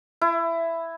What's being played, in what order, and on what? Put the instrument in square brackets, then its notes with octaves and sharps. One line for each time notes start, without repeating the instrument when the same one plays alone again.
[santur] E4